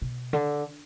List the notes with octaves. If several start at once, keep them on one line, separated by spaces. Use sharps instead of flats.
B2
D3